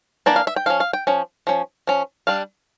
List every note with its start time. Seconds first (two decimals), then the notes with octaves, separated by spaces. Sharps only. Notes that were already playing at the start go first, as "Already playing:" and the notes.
0.26 E3 A#3 D4 D5
0.36 F5
0.47 E5
0.56 G5
0.66 F3 C#4 F5
0.80 F5
0.93 G5
1.07 F3 C#4
1.47 F3 C#4
1.87 F3 C#4
2.27 G3 D4 F5